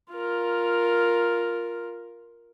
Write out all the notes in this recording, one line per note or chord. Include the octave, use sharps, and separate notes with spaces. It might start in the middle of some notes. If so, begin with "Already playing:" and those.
F4 A#4